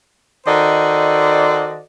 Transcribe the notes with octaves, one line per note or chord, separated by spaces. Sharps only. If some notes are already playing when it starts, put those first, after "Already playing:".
D#3 F#4 A4 C5 D5 D#5